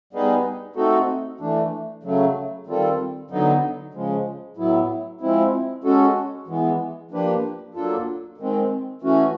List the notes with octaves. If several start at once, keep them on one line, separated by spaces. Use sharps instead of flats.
G3 B3 D#4 G#4 B4
A3 C4 D#4 F#4 A4
E3 A3 D4
C#3 F#3 A3
D#3 G3 C4 F4 A4
D3 F#3 B3 D#4
C#3 F3 G#3
A2 F#3 B3 E4
F3 G#3 C4 E4
G#3 C#4 F#4 A4
E3 G#3 B3
F3 A#3 D4 G4 B4
F#3 A#3 D4 F4 A4
D#3 G#3 C4
E3 A3 C#4 F#4